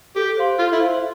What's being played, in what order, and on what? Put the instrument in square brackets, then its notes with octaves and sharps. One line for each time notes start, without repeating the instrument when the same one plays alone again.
[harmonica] G4 [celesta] A4
[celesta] C5 F5 C6
[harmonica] F4 [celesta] A4
[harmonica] E4
[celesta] C5 F5 C6